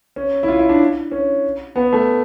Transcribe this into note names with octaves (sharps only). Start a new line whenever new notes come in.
C#4
E4
F4
E4
D4
C#4
B3
A3